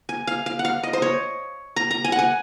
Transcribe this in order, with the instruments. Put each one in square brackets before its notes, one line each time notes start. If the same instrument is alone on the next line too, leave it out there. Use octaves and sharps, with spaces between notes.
[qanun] G#5
F5
F5
F#5
F5
D#5
C5
C#5
A#5
A#5
G#5
F#5
G#5